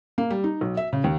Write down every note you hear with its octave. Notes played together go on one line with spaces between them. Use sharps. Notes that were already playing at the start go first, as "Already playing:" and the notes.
A#3
G3
D#4
B1
E5
C#3
D#2